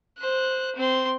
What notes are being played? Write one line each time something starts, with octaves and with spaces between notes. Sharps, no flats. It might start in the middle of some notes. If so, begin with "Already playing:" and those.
C5 F#6
C4 C6